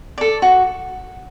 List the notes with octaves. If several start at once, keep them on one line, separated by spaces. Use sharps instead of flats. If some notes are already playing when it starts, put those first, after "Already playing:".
A4 D5
F#4